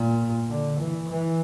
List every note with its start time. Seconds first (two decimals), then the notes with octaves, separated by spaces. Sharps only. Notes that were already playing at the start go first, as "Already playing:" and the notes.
Already playing: A#2
0.49 D3
0.79 E3
1.09 E3